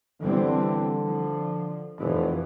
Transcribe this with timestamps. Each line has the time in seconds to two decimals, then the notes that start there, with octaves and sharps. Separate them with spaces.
0.21 D3 E3 G3 C4
1.05 F3
1.99 F1 F2 E3